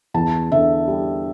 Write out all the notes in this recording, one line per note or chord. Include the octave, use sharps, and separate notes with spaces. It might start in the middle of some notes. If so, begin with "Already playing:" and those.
E2 A5
D3 E5
G3